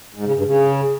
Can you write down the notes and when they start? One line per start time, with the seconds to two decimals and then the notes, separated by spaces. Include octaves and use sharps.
0.15 G#2
0.25 C#3
0.36 G2
0.46 C#3